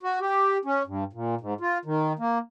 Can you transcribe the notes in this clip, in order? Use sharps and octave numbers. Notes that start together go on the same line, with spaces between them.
F#4
G4
C#4
G2
A#2
G#2
F4
D#3
A#3